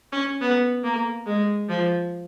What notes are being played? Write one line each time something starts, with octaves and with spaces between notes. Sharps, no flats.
C#4
B3
A#3
G#3
F3